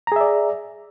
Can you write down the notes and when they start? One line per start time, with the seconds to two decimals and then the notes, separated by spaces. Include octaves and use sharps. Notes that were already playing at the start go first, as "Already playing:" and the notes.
0.07 A#5
0.12 G#4
0.16 E5
0.21 D5